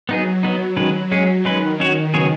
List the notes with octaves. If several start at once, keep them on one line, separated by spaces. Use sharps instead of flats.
F#3 B3 D#4 G#4
F#3 B3 D#4
D#3 F#3 G#3 C#4 B4
G#3 C#4 G#4
D#3 G#3 C#4 B4
F#3 C#4 F#4 C#5
C#3 F#3 B3 G#4 C#5